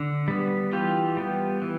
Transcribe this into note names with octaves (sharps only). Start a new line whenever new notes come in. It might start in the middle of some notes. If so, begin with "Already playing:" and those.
Already playing: D3
G3 B3
E3 F4 G4
G3 B3
E3